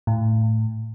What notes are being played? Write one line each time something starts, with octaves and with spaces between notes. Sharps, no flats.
A2